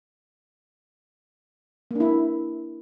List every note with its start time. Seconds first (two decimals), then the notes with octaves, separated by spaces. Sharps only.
1.91 A#3
1.95 D4
2.00 E4